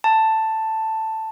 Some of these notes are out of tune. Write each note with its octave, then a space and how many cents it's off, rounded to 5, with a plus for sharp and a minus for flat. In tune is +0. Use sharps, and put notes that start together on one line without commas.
A5 +5